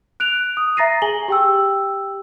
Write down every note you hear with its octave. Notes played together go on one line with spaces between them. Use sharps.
F#6 D7 F7
D#6
E5 A#5 A6 A#6 C7 D#7
G#4 G#5 F#7 G7
G4 G5 E6